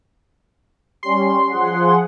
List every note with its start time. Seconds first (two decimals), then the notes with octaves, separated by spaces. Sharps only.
1.03 G3 C#4 C6
1.49 F3 G#4 F#5